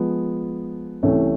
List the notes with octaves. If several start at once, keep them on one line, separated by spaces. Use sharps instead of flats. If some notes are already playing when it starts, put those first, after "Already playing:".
Already playing: F3 G#3 B3
C2 C3 E3 A3 C#4